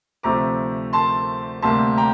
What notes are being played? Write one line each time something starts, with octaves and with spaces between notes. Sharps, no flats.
D2 C3 F3 A3 C4 A#5 D6
A5 C6
D2 C3 G3 A#3 A5 C6
G5 A#5